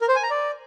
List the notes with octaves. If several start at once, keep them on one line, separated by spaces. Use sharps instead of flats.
A#4
C5
G#5
A#5
D5